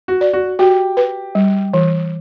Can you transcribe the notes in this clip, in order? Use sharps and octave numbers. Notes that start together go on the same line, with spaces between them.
F#4
D5
F#4
F#4 G4
B4
G3
E3